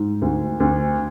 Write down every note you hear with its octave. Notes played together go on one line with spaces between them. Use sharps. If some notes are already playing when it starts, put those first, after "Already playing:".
Already playing: G#2
D2
D2